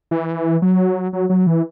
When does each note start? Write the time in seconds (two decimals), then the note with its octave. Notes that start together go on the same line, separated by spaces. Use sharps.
0.11 E3
0.62 F#3
1.13 F#3
1.29 F#3
1.47 E3